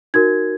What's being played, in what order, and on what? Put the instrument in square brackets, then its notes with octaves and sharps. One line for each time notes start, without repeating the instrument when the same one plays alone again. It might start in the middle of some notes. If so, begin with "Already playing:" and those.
[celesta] D#4 F#4 A#4 G#6